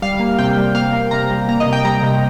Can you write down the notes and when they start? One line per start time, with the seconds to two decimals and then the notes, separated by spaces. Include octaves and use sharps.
0.02 G3 F5
0.20 A#3
0.39 C3 G5
0.57 G3
0.75 A#3 F5
0.93 A#3
1.11 C3 A#5
1.31 G3
1.49 A#3 A#5
1.60 D#5
1.66 C3
1.73 G5
1.85 G3 A#5
2.03 C3